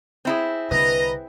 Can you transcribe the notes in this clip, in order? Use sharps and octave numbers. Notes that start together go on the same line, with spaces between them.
C4 E4 G#4
C2 D3 B4 D#5 A#5